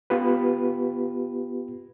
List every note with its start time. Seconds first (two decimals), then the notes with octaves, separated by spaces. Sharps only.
0.10 B3 F4 G4 B4